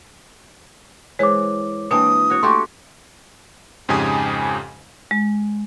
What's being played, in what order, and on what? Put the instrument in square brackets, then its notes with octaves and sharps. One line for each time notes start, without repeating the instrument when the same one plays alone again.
[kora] E3 [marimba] G#3 G#4 C5 [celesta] C#5 D6
[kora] E3 C4 [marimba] A#3 D4 A5 [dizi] D#6
[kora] F#4 C#5
[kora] A3 F#4 G4 [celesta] C6 C#6
[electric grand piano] F2 G#2 C#3 G4 G#5 D#6
[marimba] G#3